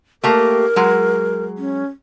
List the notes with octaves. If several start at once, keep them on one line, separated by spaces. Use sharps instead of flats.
A3 A#3 G4 A#4
F#3 G#3
C#4